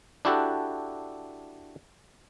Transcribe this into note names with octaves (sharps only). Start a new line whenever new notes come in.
D4 E4 F#4 G4 A4